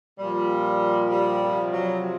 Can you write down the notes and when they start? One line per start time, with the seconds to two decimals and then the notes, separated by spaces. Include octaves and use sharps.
0.18 A#2 F3 G3
1.11 G3
1.42 C3 F3
1.73 F#3